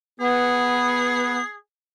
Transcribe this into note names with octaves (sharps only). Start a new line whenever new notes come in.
B3 G#4